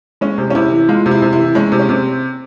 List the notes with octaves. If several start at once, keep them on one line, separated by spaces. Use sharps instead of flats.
G#3 C#4
C3
C#4
C3 E4
E3
G#3 F4
C3
E4
C3
E4
E3
G#3 C#4
C3
C#4
C3 C4